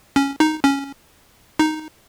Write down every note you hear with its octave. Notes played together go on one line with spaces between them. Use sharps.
C#4
D#4
C#4
D#4